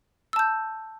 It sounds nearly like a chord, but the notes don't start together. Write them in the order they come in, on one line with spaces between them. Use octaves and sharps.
E6 A5 G6